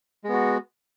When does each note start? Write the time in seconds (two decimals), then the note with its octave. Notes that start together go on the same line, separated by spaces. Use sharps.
0.24 G#3
0.29 B3
0.33 F#4